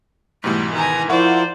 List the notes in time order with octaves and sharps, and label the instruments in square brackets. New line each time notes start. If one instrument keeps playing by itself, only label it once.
[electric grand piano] G#2 B2 E3 [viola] G3 [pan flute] A3
[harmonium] D#3 [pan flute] D#4 [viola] G#5 A#5
[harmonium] F3 A#4 [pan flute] E4 [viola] C5 D5 [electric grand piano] E5 F#5 C#6